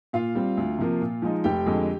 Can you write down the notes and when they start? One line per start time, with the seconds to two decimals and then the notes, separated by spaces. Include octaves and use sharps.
0.13 A#2 F4 F5
0.35 G3 C4
0.57 D2
0.79 C3 F3 A#3
1.01 A#2
1.22 F3 G#3 D#4
1.44 F1 G4 G5
1.66 F2 D3 G#3